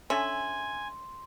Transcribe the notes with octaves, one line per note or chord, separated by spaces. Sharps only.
D3 C#4 E5 G#5 C6